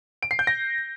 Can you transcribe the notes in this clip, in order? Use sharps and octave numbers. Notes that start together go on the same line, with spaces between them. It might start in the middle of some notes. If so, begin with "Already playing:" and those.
D7
C7
G6
A#6